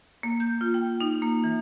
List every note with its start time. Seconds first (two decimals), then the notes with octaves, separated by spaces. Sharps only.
0.23 A#3
0.40 G6
0.61 F4
0.74 G5
1.00 D#4
1.22 A#3
1.44 E3